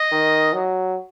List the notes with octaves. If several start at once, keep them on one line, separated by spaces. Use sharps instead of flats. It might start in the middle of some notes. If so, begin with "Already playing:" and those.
Already playing: D#5
D#3
F#3